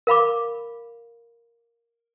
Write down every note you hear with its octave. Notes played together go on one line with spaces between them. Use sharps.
A#4 F5 B5 D6